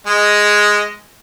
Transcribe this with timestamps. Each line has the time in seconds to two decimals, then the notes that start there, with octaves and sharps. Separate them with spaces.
0.07 G#3 D#5